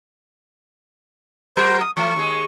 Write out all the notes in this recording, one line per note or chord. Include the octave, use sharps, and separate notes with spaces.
F#3 F#4 A#4 C5
D#6
E3 A3 C#6
D#2 G#3 G#4